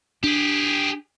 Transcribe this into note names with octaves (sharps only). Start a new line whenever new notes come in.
D4 G4 G#4